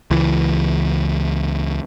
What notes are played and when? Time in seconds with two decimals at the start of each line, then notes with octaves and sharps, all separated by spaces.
0.11 C#2 E3